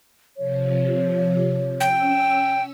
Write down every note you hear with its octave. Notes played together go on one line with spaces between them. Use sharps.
C3 F3 C#5
C#4 G5 E6